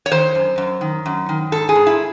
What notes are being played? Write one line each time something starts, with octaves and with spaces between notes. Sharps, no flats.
C#5
D#3 C5
F#2
F#2
D#3
F#2
D#3
G#2 A4
G#4
G#2
E4